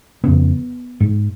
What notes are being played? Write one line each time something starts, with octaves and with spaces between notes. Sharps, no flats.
F2 C#3 B3
G#2